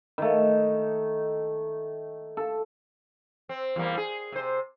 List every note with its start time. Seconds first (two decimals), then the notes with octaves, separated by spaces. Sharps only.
0.18 D#3 A3
2.37 A4
3.49 C4
3.76 E2 G3 A#3
3.97 G#4
4.32 C3 C5